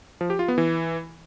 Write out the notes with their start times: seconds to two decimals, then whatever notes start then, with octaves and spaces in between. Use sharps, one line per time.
0.21 F3
0.30 G4
0.39 F4
0.48 B3
0.58 E3